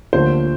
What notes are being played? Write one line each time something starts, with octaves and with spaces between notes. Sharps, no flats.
D2 D3 F3 A#3 C5